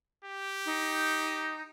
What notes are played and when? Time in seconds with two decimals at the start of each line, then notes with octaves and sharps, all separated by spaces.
0.25 G4
0.66 D#4